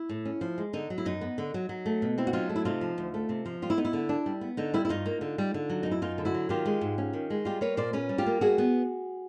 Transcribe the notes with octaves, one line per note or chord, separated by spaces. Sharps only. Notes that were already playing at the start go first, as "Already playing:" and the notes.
Already playing: E4
A2
C#4
F3
G#3
D3 D#4
F#3
E4
F#2 D#4
B3
D3
F#3
F#3
A3
B2
C4 E4
F#4
F#3 D#4 F4
A3
E4
C3 D#4 F4
F3
D2
A3
C3
F3
G3 F4
E4
B3 D#4
E4
D3
D4
G3
B3
D3 D#4
G3 E4
E4
G2 D#4 F4
A#3
D3
G3
D3
F#3
F#2 D#4
E4
F#2 D#4 F4
D3
E4 F#4
F#3
D#3 F4 G4
G#3
G#2
C#4
D#3
G#3
G3 F4 G4
A#3 B4 C#5
A#2 C5 D5
C#4 B4 C#5
G3
F4 G4
A#3
G3 F#4 G#4
B3